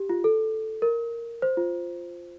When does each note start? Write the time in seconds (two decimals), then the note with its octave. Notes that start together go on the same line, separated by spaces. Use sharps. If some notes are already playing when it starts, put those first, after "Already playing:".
Already playing: G4
0.09 F4
0.24 A4
0.82 A#4
1.42 C5
1.57 F4